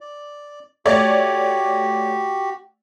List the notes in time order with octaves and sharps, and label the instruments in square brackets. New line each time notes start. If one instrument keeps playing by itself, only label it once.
[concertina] D5
[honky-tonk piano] A3 C#5 D5 [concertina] F#4 G4